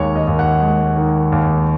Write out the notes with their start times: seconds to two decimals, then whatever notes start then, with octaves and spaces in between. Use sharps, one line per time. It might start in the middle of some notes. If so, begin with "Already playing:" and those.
Already playing: D#2 D#3 G#3 C#5
0.16 D#5
0.27 D#2
0.39 F#5
0.62 G#3
0.96 D#3
1.32 D#2